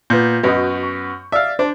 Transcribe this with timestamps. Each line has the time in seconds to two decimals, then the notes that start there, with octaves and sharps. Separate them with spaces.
0.10 A#2 B3 G6
0.43 F#2 B3 F#4 D#5
0.83 C#6
1.32 D5 E5 F5
1.59 D4 C5